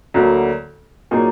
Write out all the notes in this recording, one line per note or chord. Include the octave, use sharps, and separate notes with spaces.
D2 D3 F#3 A#3
A#2 F#3 A#3 D#4 G#4